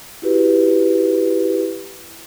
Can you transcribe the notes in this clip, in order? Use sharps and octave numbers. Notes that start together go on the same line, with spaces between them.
E4 F#4 G4 B4